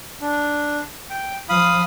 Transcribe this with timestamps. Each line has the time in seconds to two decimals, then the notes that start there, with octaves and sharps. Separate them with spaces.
0.21 D4
1.10 G5
1.49 F3 F5 B5 D#6